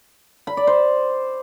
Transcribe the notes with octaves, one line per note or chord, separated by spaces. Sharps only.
B5
D5
C5